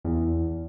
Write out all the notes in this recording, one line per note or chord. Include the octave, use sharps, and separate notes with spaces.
E2